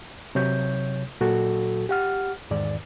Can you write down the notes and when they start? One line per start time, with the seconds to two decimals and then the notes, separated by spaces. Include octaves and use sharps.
0.35 C3 F#3 C#5 G6
1.21 A#2 F#3 F#4 A4
1.89 G4 F#5 F6
2.50 E2 G#2 D#3 D5